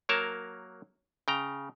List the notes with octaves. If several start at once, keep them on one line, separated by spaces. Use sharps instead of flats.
F#3 A#3 A#4 C#5 A5 A#5
C#3 G5 A#5